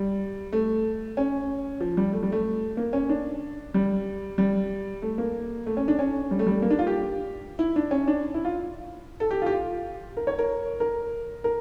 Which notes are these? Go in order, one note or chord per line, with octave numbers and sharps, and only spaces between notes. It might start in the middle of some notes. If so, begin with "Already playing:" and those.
Already playing: G3
A3
C#4
F3
G3
A3
G3
A3
A#3
C#4
D4
G3
G3
A3
A#3
A3
C#4
D4
C#4
G3
A3
G3
A#3
D4
F4
G4
E4
D4
C#4
D4
E4
F4
A4
G4
F4
G4
F4
A#4
C#5
A#4
A#4
A#4